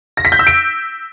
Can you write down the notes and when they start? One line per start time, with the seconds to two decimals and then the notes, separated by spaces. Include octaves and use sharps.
0.17 A#6
0.25 B6
0.32 G6
0.39 E6
0.47 D7